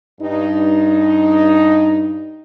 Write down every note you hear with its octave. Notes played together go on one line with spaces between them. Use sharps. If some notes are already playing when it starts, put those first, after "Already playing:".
G2 D#4